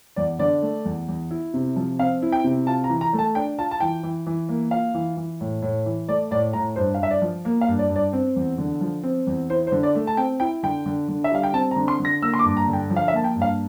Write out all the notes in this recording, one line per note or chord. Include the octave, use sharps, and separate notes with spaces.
E2 D5
D3 D5
A3
E2
E2
E4
C3
F3
C4 F5
E4
G5
C3
F4 A5
A#5
E3
A#5
A3
A5
D4 G5
F4 A5
A5
E3 G5
E3
E3
A#3
F4 F5
E3
E3
A2
A2
E3
A3 D5
A2 D5
A2 A#5
G2 C5
F5
G2 E5
D5
F3
A#3
F5
G2
D5
G2
D5
C4
E2
D3
F3
C4
E2
E4 C5
C5
D3
D5
A3
A5
C4 G5
E4 G5
D3 G5
D3
D3
E5
G3 F5
G5
C4 A5
A#5
D3
C6
D3
A#6
A#3 E6
C6
D6
G2
A#5
D3
G5
F3
F5
E5
A#3 A5
G5
G2
F5